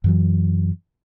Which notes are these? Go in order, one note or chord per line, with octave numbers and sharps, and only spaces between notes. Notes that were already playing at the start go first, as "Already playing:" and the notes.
F#2 E3 F#3